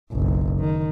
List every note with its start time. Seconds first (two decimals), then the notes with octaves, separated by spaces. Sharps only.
0.12 F#1 B1
0.60 D#3